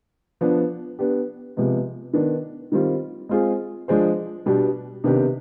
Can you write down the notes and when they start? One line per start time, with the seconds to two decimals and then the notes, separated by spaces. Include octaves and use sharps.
0.41 F3 B3 D4
0.99 B3 D4 G4
1.57 C3 F3 G#3 B3
2.13 D#3 B3 D4
2.72 D#3 G3 C4 F4
3.29 G#3 C4 F4 G#4
3.88 F3 G#3 D4 G#4 C5
4.46 B2 G3 B3 D4 G4
5.04 C3 D#3 B3 D4 G4